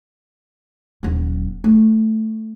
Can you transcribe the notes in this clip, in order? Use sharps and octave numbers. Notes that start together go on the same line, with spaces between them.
D#1 F#3
A3